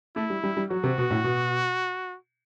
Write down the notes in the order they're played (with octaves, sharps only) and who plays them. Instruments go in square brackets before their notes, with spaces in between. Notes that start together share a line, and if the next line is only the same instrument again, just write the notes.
[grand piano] A3 [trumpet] E4
[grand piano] G3
G3
G3
[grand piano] F#3 [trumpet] F#4
[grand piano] C3
B2
A2
B2